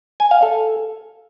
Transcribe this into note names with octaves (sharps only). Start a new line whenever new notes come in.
G#5
F5
A4